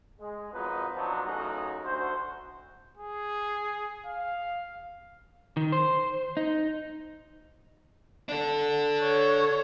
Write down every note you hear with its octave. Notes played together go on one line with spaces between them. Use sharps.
G#3
G#1 F3 F#3 B3 D#4 B4
F3 F#3 B3 D4 D#4 C5
A1 F#2 C#3 D#4 F#4
D2 D3 F#4 C5
G#4
F5
D#3
C5
D#4
D4 A4
C#5